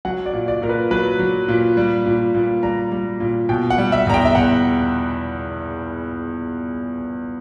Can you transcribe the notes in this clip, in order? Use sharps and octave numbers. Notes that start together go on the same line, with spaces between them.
F#3 F#5
D5
A#2
D5
A#2 A#4
B4
F#3 B4
F#3
A#2
G3
A#2
A#2
G3 A#5
G3
A#2
B2 G5
F#5
G3
E5
E2 A#5
G5
E5
E2 F#5